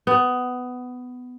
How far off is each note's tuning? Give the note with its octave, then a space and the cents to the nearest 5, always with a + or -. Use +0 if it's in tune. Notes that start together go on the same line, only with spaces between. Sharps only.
B3 +15